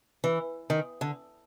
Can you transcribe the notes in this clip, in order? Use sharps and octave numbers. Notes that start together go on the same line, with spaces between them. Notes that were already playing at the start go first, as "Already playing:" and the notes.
E3
D#3
D3